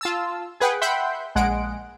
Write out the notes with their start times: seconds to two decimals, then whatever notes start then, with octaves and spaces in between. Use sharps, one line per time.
0.01 F4 A5 E6
0.60 G#4 B4 F#5 G5
0.81 E5 F#5 G5 B5 C6 G6
1.35 A#1 G#3 F#5 D7